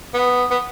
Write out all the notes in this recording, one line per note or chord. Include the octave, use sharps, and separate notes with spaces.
B3
B3